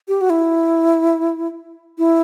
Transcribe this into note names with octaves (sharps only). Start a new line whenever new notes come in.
G4
F#4
E4
E4